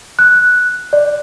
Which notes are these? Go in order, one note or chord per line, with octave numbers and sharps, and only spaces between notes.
F#6
D5